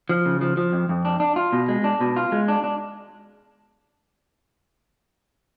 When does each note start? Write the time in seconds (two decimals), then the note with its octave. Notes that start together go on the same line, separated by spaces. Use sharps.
0.09 F3
0.26 C#3
0.41 F3
0.57 F3
0.73 F2
0.89 F2
1.05 D4
1.20 D4
1.36 F4
1.53 B2
1.69 G#3
1.84 D4
2.01 B2
2.16 F4
2.32 G#3
2.48 D4
2.64 D4